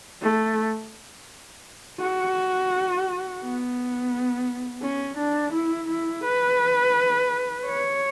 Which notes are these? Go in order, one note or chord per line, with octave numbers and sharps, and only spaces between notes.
A3
F#4
B3
C#4
D4
E4
E4
B4
C#5